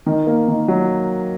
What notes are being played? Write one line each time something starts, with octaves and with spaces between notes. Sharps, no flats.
D#3
A#3
D#3
F#3